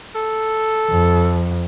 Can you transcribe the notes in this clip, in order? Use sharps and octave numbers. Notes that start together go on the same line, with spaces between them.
A4
F2